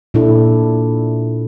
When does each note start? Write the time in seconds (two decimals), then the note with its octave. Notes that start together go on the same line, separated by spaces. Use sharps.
0.14 A#2 D4 E4 A4